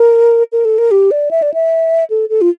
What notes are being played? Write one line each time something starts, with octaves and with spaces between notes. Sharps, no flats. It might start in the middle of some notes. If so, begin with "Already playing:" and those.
Already playing: A#4
A#4
A4
A#4
G4
D5
E5
D5
E5
A4
A4
F4